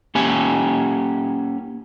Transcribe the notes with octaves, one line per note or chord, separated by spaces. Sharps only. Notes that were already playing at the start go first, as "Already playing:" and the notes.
A#3 C#4 G4 G#5